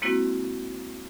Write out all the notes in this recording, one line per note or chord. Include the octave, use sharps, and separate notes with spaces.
G#3 A#3 C4 E4 F#4